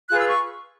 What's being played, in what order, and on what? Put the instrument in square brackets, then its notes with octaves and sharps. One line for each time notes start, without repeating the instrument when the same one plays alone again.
[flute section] F4 G#4 B4 F#6
E6
C#6